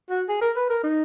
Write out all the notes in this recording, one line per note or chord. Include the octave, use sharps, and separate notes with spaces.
F#4
G#4
A#4
B4
A#4
D#4